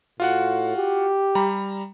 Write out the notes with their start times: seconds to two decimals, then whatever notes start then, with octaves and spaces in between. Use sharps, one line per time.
0.20 A2 F4 F#4 F#5
0.77 G4
1.35 G3 A#5 B5